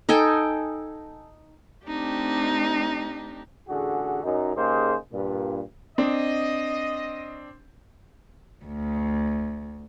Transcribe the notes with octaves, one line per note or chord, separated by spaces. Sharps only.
D#4 A4 G5 G#5
A3 C4 D4 D#4 G4
A1 D3 F#4 G#4
F#2 D#4
C#3 A#3 D#4 G4 G#4 C5
G2 A#2
C4 D4 D#5
D2